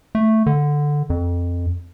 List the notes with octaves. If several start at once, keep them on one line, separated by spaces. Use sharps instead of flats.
A3
D3
F2